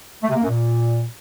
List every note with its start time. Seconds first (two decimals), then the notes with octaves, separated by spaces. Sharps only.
0.23 A3
0.29 C3
0.36 A#3
0.43 F#2
0.49 A#2